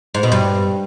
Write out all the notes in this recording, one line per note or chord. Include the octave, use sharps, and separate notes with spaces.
G#2
B2
G2